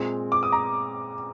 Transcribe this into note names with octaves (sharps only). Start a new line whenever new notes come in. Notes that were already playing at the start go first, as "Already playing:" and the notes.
Already playing: A#2 G#3 C4
D6
D#6
A#5